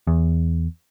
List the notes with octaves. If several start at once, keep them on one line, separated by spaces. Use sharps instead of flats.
E2